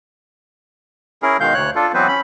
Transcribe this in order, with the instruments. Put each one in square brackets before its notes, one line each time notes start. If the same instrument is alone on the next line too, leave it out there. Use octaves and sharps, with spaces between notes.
[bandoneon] C#4 E4 G#4 A#4
B2 D#3 G#3 F5 G6
D2 C#5 F#6
D4 F4 A4
E3 F#3 B3 C4 B4 C5
C#4 B5